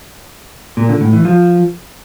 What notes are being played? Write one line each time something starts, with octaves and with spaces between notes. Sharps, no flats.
A#2
D3
A2
E3
F3